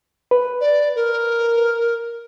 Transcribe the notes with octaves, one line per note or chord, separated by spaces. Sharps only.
B4
D5
A#4